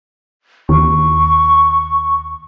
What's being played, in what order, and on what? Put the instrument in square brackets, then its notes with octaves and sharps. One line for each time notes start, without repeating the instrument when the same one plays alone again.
[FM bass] D#2 [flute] C#6